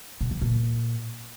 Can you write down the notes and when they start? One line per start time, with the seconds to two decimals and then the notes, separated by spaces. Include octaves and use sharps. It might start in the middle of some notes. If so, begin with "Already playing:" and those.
0.21 B2
0.31 E3
0.41 A#2